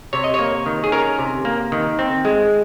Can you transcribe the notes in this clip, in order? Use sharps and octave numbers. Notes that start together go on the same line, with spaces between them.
C3 C#5
D#5
C#5
A#3
D#3
G#4
C#4 A#4
C3
A#3
D#3
C4
G#3